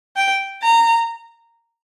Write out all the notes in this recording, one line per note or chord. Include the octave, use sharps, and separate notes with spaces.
G5
A#5